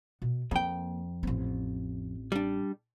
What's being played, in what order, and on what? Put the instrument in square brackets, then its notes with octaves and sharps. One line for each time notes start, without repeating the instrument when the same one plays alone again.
[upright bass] B2
[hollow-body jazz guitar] F2 G5 [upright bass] A#3
[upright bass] A1 C4
[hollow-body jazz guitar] G3 D4